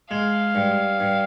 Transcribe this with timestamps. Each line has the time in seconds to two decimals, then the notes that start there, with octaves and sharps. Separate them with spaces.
0.10 G#3 F5
0.55 G2
1.00 G2